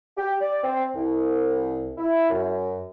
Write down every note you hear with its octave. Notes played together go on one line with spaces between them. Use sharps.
G4
D5
C4
C2
E4
F#2